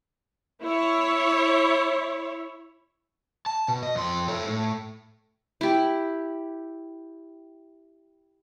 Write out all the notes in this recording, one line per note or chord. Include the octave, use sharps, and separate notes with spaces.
E4 C#5
A5
B2
D#5
F2 C6
A4 C#5
A2
E4 G4